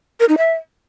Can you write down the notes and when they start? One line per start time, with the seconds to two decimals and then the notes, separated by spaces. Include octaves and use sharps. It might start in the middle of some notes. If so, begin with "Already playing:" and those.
0.20 A#4
0.29 D#4
0.38 E5